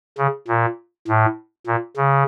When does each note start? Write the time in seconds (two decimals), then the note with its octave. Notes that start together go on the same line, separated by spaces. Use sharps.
0.18 C#3
0.48 A#2
1.08 A2
1.67 A#2
1.97 C#3